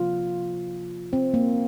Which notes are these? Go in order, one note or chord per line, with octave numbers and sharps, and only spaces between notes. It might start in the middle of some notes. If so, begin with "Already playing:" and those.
Already playing: C3 F3 A#3 F4
C4
A#3